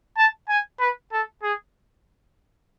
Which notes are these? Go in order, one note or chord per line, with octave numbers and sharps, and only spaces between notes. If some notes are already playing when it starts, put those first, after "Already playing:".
A5
G#5
B4
A4
G#4